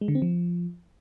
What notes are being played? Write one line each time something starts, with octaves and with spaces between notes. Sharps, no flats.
G#3
D3
C4
F3